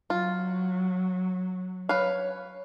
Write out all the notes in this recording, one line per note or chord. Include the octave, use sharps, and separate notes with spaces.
F#3 F4
B4 C#5 F5